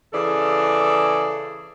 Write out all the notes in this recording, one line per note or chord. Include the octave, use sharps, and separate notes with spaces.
C#3 E3 G#4 A4 D5